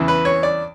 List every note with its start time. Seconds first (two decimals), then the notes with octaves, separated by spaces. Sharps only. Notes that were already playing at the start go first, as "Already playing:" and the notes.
Already playing: E2 C#3 E3
0.08 B4
0.25 C#5
0.43 D5